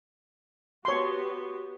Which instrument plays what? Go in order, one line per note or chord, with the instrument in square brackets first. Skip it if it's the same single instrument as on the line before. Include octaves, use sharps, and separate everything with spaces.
[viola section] B3 F#4 G4 [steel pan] C#5 C6